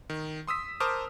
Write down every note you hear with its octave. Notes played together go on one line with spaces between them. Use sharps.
D#3
C6 D#6 E6 B6
A#4 C5 A5 D6 D#6 F6